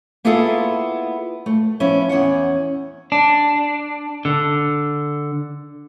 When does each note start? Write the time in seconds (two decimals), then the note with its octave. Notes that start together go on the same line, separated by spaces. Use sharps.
0.25 A#3 B3 E4 F4 G#4 A4
1.46 A3
1.80 F3 B3 C#4 E4
2.09 E2 C#4 C#5 F#5
3.12 D4
4.25 D3